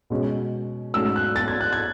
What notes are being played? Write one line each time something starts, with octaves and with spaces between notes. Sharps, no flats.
B2 G#3 C#4
G#2 F#3 A3 C#4 E6
F#6
A6
G#6
F#6
G#6